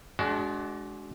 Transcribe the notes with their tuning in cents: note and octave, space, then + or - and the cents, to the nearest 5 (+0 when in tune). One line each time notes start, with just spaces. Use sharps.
G#3 +25 D4 -15 F#4 +25